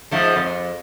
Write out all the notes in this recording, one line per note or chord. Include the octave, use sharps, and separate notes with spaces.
G#2 F3 A3
F2